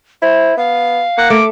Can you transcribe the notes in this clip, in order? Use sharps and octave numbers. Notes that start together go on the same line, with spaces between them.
E4 C5
B3 F5
A#3 F#5
A3 D6